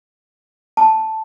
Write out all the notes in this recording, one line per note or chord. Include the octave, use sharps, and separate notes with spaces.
A5